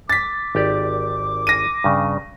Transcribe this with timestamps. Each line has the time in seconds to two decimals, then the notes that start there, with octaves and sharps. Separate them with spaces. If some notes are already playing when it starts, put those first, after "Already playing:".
0.10 D6 A6 B6
0.55 G#1 G4 D5
1.47 A#6 D#7
1.84 G2 C#3